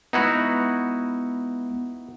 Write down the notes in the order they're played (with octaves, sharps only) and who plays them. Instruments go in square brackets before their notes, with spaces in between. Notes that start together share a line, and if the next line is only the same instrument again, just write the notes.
[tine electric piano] G#3 B3 [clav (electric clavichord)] D#4 E4 F#4